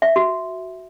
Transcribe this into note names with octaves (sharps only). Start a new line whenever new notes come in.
E5
F#4